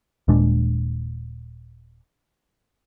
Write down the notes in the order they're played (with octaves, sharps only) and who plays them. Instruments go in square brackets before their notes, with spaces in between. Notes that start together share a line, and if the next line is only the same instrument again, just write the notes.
[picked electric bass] D#1 A#2 G#3 D4